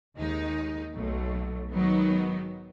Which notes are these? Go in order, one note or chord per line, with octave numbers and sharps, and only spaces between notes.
D#2 D#3 G#3 D#4
B1 B2 F#3 A3
G#2 D#3 F#3 B3 D#4